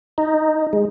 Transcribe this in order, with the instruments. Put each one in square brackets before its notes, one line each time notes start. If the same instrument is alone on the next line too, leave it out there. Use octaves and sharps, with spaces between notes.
[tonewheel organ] D#4
G#3